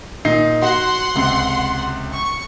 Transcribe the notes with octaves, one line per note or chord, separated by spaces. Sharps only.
A#2 D#4 C7
F#4 F#5 C6
C#2 C3
C#6